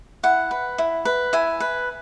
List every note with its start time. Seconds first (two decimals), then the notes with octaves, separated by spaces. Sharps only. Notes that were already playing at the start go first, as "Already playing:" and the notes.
0.23 E4 F#5
0.51 B4
0.78 E4
1.05 B4
1.33 E4 G#5
1.60 B4